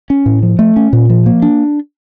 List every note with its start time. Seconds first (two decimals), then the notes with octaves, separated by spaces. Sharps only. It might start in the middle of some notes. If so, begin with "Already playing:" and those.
0.10 C#4
0.26 A2
0.43 F3
0.59 A3
0.76 C#4
0.93 A#2
1.10 F3
1.26 A#3
1.42 D4